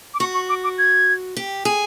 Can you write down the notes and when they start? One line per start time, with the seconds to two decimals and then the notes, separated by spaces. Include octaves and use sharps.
0.14 D6
0.20 F#4 C#6
0.34 C#6
0.49 D6
0.64 D6
0.78 G#6
1.37 G4
1.65 G#4